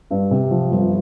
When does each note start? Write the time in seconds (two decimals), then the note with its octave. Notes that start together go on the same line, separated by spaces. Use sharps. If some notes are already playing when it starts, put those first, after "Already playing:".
0.11 G2
0.31 C3
0.51 F3
0.71 G1